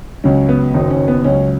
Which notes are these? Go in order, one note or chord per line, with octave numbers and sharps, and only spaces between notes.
C#2 C#3 F#3 C#4
B3
F#1 F#2 D#3 F#3 D#4
C#4
B3
C#2 C#3 F#3 C#4